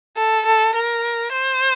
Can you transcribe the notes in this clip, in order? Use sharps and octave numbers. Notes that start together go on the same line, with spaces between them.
A4
A4
A#4
C5